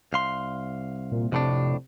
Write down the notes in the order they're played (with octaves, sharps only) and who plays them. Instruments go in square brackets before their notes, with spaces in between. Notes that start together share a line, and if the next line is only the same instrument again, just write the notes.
[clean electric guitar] C2 F5 C6
[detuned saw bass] A#2
[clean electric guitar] F2 A2 D4 [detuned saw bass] C3